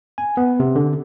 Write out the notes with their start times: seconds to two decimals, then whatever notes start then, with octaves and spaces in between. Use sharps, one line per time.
0.18 G#5
0.37 B3
0.60 C3
0.76 D3